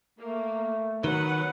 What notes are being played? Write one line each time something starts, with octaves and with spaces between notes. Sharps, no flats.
A3 A#3
D#3 F#3 B3 B4 F#5